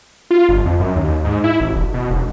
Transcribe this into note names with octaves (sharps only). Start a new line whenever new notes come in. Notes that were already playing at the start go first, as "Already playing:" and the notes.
F4
G1
F2
F#2
D#2
G#2
E4
A1
E1
B2
E1